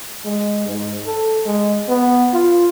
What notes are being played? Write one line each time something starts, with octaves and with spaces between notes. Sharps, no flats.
G#3
G#2
A4
G#3
B3
F4